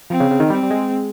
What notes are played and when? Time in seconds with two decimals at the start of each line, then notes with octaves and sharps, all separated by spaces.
0.10 F3 C4
0.20 C#3
0.31 C#3
0.40 D#3
0.50 G3 C4
0.63 G3
0.71 G#3